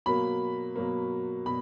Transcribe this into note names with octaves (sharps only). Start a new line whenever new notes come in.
B2 F#3 A#3 B5
B2 F#3 A#3
B2 B5